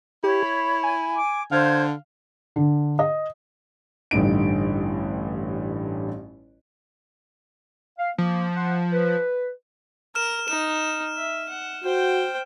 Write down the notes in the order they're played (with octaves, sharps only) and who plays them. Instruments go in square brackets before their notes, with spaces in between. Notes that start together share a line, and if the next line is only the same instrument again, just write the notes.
[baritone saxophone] E4 [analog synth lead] G4 [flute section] C#5
[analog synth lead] B5
G#5
[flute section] D6
[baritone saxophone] D3 [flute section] C5 G6 G#6 [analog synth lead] F5
[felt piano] D3
D#5
[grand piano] A1 G2 D3 D#4 D7
[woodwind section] F5
[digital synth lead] F3 [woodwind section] A#3
[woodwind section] F#5 C6
B4
[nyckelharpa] A#4 [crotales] F6 E7
[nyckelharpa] D#4 [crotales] E7
[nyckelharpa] E5
F#5
[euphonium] F#4 [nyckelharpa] C5 G5